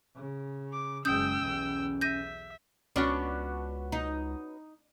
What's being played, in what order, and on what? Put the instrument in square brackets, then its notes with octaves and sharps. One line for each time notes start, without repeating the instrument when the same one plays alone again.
[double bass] C#3
[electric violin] D6
[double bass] F#1 G#3 [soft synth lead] C#4 [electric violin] G5 E6 [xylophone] D#6 G6
[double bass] B1 E2
[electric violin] E5 [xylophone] G6 A#6 D#7
[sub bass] C#2 [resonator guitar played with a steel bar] B3 C#4 F#4 [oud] D4
[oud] D#4